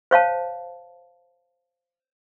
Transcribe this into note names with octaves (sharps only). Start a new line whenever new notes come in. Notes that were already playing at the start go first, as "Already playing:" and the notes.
C5 C#5 F5 A5